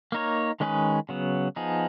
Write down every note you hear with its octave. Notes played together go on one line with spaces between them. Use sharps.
A#3 D#4 A#4 C#5
D#3 G#3 C#4 G#4 B4
C#3 F#3 B3
F3 B3 D#4 G#4